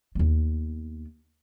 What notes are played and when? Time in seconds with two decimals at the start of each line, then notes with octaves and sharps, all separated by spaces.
0.15 D#2 B3